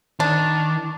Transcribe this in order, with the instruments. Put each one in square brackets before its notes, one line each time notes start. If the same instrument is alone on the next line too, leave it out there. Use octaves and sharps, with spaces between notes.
[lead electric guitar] D#3 [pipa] D4